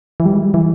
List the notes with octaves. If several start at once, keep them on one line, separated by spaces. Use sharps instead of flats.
E3
G3
G#3
G3
E3